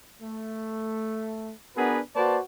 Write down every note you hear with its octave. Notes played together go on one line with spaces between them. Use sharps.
A3
B3 D4 F#4 G#4 A#4 B4
A#3 F#4 B4 C5 D5 A5